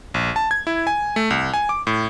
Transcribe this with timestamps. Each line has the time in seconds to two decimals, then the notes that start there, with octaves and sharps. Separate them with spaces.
0.14 A#1
0.36 A5
0.51 G#6
0.67 E4
0.87 G#5
1.16 A3
1.30 C2
1.54 G#5
1.69 D6
1.87 A2